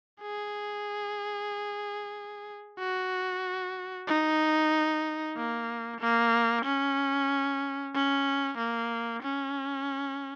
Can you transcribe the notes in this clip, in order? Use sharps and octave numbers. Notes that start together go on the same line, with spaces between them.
G#4
F#4
D#4
A#3
A#3
C#4
C#4
A#3
C#4